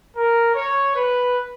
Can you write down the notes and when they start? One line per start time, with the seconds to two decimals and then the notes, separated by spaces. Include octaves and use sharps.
0.15 A#4
0.54 C#5
0.94 B4